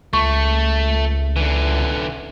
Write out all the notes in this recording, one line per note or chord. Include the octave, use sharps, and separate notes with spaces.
C#2 A3 C#6
D3 E3